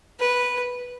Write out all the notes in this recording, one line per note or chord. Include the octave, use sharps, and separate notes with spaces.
B4